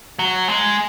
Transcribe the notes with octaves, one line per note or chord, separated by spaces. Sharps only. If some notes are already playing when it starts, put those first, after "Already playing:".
F#3
G#3